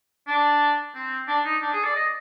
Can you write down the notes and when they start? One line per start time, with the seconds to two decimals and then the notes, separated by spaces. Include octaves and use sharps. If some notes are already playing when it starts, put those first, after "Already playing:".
0.27 D4
0.95 C4
1.27 D4
1.45 D#4
1.62 D4
1.73 G#4
1.84 D5
1.95 D#5